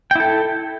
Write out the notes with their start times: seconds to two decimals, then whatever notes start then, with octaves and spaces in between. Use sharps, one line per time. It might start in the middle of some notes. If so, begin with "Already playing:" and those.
0.11 G5
0.15 E4
0.20 A4